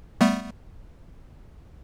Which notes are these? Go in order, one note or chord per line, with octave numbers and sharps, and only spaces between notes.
G3 A3 B3